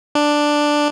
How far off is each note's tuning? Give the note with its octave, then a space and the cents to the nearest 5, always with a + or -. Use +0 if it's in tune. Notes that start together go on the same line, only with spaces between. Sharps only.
D4 +5